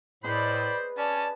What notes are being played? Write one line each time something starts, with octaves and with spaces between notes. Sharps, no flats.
A2 G#4 B4 C5 D5 D#5 B5
C#4 D5 G#5 A5